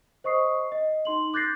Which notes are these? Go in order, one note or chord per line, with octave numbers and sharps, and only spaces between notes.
C5 D#5 C#6 D#6 C7
D#5
D#4 C6 F#7
D6 F#6 G6 A6 A#6 C7